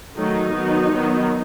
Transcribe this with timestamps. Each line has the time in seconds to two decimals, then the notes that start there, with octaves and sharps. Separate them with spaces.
0.16 D#3 F#3 A3 D#4
0.54 D#3 F#3 B3
0.93 D#3 F#3 B3